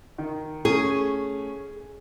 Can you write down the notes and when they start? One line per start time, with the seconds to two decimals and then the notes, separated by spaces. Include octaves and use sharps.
0.18 D#3
0.65 A3 C#4 G#4